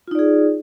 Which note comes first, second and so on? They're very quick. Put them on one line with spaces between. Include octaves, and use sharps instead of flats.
F4 D#4 D5 G#4